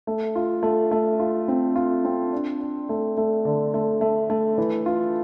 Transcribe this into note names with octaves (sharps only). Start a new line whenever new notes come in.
A3
F4
A3
A3
F4
C4
F4
C4
D4
D4
A3
A3
D3
A3
A3
A3
E3
F4